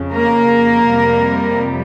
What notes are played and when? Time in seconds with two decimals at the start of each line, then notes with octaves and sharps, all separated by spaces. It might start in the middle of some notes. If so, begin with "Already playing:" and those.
Already playing: F2 C#3
0.13 A#3 A#4
0.87 F2 C3 G3